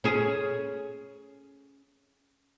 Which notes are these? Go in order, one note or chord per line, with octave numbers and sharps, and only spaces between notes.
C#4 G#4